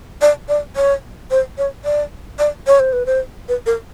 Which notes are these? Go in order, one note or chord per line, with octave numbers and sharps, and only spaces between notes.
D5
D5
C#5
C5
C#5
D5
D5
C#5
C5
B4
C5
B4
A#4